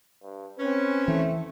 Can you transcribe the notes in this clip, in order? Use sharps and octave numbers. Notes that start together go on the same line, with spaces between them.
G2
C4 C#4 B4
E3 A3